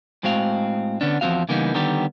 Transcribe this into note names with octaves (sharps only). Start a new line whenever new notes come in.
A2 G#3 C4 F#4 F5
D3 B3 C#4 D4
E2 F3 A#3 C4 F#4 F5
C#3 E3 G3 A#3 B3 D#4
D3 D#3 G3 B3 G4